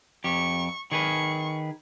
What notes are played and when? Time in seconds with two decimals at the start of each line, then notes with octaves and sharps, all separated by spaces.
0.24 F2 G4 C#6
0.92 D#3 G#4 B4 C#6